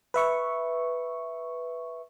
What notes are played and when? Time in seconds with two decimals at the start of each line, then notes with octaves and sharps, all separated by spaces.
0.14 B4 E5 C#6